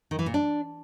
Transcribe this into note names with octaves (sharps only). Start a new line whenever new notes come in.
D#3
E3
A#2
D4